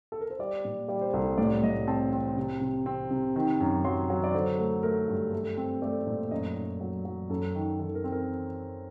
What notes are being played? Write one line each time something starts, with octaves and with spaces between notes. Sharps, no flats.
A4
A#4
C5
G3 D5
A#2
G3 D5
C5
C2 A4
A2 D5
A2 D#5
C4 A5
C4
C3
C3
C4
C3
D#3
F#2
F#3 C6
F#3
D5
D3 C5
A3
A3 A#4
G2
A3
C4
A3 D5
A#2
F#2 D#5
F#2
F#3
F#3
F#2 A4
D#3
D#3 A4
A#4
C4
A#4